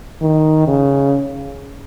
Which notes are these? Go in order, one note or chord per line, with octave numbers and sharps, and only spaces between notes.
D#3
C#3